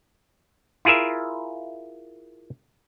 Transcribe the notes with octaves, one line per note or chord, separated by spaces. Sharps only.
E4 F4 G#4 A#4 E5